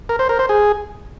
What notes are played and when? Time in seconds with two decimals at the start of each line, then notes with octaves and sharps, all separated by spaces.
0.09 A#4
0.19 C5
0.29 A#4
0.39 C5
0.49 G#4